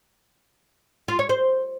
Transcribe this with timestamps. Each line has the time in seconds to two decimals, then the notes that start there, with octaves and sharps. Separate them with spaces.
1.08 F4
1.19 C#5
1.29 C5